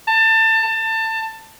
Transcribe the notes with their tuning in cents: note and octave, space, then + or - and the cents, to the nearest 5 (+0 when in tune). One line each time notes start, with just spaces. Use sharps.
A5 +25
A5 +25